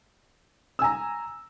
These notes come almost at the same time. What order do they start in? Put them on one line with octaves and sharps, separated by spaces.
E6 G#5 A#5